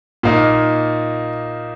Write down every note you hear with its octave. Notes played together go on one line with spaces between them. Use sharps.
A#2 A#3 D#4